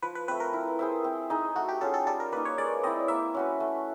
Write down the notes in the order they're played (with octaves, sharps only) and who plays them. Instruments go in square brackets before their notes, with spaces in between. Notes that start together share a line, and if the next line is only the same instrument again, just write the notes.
[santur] F3 [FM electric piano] B4
[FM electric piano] B4
[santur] C4 [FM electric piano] B4
[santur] A3
[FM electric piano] A#4
[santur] E4
G#4 C5 E5
C4
D#4 G#4
[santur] A3 [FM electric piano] F#4
[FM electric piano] G4
[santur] C#4 F4 G#4 [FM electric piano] A4
[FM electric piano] A4
[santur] G3 [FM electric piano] A4
[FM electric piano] A#4
[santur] A#3 [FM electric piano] B4
[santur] D#4
[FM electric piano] C#5
[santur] G#3 [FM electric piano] D5
[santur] C4 [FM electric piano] D#5
[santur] E4
[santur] A#3 [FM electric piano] E5
[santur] C#4 F#4 B4
A3